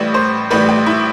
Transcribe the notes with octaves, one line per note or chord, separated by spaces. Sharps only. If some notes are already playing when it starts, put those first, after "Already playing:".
Already playing: A1 A2 G3 B4
C5
A1 A2 G3 B4
G4
E4